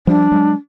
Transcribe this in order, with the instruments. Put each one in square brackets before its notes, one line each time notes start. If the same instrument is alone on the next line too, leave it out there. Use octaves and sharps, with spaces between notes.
[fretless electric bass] F3 G3 [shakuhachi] D4
[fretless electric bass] F#3 G#3